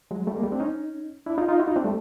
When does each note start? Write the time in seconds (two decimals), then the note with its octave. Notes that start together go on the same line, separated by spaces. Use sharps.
0.11 F#3 G#3
0.27 G3 A3
0.36 G#3 A#3
0.43 G3 A3
0.52 C4 D4
0.60 C#4 D#4
1.26 D4 E4
1.38 D#4 F4
1.48 D#4 F4
1.59 E4 F#4
1.67 D#4 F4
1.76 C4 D4
1.84 G3 A3